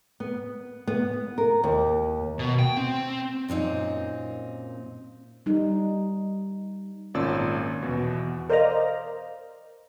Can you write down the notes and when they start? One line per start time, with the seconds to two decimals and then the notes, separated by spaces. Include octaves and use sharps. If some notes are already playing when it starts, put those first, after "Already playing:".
0.20 B3
0.87 B3
1.38 A#4
1.64 D#2
2.39 B2
2.59 G5
2.77 C4
3.48 F#2 A#2 C4 D#4
5.46 G3 D#4
7.14 G#1 A#2 C#4 D5 E6
7.83 E2 B2
8.49 A#4 C5 D5 D#5 F5 A#5